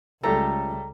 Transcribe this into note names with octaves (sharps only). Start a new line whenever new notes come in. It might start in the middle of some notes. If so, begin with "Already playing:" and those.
C#2 G3 A3 A4 A#5